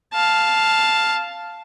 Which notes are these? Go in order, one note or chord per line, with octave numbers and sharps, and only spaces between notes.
F5 A5